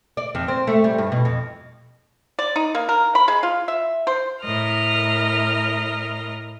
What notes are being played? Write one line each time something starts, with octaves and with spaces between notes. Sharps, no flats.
D5
F2
C4
A3
G3
G2
B2
F2
D5
D#4
A#3
A#4
B5
G#3
F4
E5
C5
A2 A#4 D#5 F6